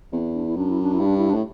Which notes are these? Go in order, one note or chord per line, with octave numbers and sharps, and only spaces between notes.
E2 C4
D4
E4
F#2 D4
E4
D4
E4
G2
D4
E4
D4
A2